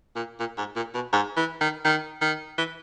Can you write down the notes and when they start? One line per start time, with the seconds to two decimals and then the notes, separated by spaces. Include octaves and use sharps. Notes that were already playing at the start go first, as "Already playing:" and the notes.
0.16 A#2
0.40 A#2
0.58 G#2
0.76 A#2
0.94 B2
1.13 G#2
1.37 E3
1.61 D#3
1.85 D#3
2.21 D#3
2.58 E3